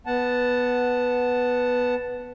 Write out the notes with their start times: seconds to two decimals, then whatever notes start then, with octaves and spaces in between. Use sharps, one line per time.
0.06 B3 F#5 A5